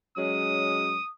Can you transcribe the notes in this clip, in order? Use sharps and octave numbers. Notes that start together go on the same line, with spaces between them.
F#3 G#3 C#4 D#6